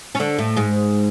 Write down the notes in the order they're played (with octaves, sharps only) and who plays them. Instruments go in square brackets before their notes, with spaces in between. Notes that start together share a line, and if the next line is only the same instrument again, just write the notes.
[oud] C#4
D3 D4
A2 A3
G#2 G#3